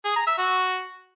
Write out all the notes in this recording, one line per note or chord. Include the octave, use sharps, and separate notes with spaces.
G#4
A#5
E5
F#4